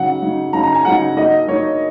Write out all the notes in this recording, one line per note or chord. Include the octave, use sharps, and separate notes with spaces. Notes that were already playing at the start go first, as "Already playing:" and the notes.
Already playing: C#3 F#3 D#4 F#5
C#3 F#3 D#4
C#3 F#3 D#4 A#5
A#5
G#5
C#3 F#3 D#4 F#5
F#3 A#3 D#4 D#5
F#3 A#3 D#4 C#5